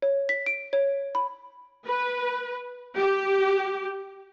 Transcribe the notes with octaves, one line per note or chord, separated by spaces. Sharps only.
C#5
B6
D7
C#5
B5
B4
G4